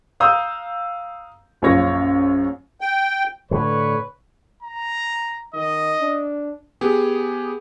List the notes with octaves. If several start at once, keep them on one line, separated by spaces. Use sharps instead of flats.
F5 A#5 D#6 E6 G6
A#1 F#2 F4 C#5 A#6
G5
A2 D3 B4 C#5
A#5
D#3 D#5
D4
B3 G4 G#4